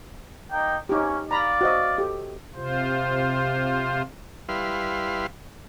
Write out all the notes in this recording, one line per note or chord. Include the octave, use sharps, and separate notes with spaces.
A#3 D#4 G5
A#3 C#4 D#4 G4
D5 F5 A#5 B5
F#4 C5 D#5
G4 A4
C3 F4 C5
G3 E4 B4 F5 C6